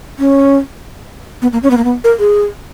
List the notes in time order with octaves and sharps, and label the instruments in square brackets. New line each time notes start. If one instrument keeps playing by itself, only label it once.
[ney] C#4
B3
A#3
C#4
B3
A#3
B3
A#4
G#4